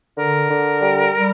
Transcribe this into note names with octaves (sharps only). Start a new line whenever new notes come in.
D3 A#4
D3
G3
G3